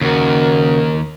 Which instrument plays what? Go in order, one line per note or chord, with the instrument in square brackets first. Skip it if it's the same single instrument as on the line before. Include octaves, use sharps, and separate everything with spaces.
[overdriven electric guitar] D#2 [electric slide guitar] C#3 F#4 [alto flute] A#4